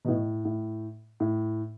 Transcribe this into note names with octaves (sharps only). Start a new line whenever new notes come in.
B2
A2
A2
A2